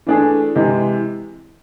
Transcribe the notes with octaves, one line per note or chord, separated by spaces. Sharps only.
E3 A3 D4 G#4
C3 E3 G#3